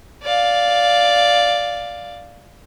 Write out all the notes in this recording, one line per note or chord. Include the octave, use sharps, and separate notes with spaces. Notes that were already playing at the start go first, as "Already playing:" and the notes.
D5 F5